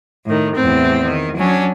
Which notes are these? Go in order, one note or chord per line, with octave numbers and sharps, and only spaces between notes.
A2 D#3
E2 A2 C4
D#3
F#3 C#4 D4